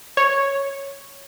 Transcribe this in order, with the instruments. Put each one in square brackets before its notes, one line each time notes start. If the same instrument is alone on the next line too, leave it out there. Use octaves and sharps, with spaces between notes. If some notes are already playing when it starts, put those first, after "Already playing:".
[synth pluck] C#5